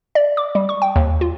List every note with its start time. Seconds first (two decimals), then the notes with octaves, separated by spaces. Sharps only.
0.15 D5
0.37 D6
0.55 G3
0.69 C#6
0.82 G5
0.96 D#2
1.21 F4